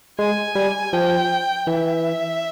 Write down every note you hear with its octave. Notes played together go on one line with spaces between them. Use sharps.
G#3 G#5
G3
F3 G5
E3 E5